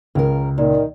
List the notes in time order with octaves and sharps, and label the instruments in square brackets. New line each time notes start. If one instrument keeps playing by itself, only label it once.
[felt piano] C#2 [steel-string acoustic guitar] C#3 A#4
[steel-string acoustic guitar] A#2 [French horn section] D#3